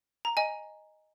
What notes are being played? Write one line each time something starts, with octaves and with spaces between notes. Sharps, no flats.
A#5
D#5 G#5